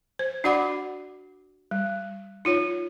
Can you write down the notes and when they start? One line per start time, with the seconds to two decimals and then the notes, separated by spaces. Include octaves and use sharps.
0.19 C5
0.44 D4 F#4 D5 F#5 B5 D6
1.71 G3
2.45 D#4 F4 C#5